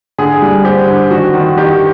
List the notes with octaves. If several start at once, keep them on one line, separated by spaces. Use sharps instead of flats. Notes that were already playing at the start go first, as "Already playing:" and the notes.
D3 G#4
G3
C4 G4
D3
D#3 F#4
D#3
D#3 G4